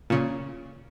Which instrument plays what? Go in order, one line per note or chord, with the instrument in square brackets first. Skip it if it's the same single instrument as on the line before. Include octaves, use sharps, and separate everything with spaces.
[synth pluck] A#2 C#3